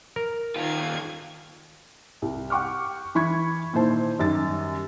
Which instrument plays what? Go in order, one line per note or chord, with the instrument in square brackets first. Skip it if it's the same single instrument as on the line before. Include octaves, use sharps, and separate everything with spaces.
[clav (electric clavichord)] A#4
[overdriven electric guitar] D#2 F4 [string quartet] D#3 F5 G#6
[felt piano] C2
F#5 G5 C#6 D6 F6
E3 B5 C#6 G#6
A#2 D#3 E4 C5 A5
F#2 D#3 G3 A6